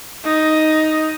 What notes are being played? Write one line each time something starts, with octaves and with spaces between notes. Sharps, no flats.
D#4